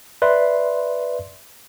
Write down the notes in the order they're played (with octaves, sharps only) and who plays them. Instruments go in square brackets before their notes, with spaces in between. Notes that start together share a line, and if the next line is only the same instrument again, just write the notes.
[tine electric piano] B4 D5 E5 C6